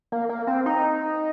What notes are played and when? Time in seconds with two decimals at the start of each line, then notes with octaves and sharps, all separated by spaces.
0.12 A#3
0.29 A#3
0.47 C4
0.66 D#4